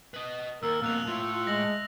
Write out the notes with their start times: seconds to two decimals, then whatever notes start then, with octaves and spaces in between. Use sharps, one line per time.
0.14 B4 D#5
0.63 D#2 A#4 E6
0.82 F2 B2 A#3 E6 F#6 F7
1.07 A2 F4
1.32 F4
1.47 G#3 A#6 F#7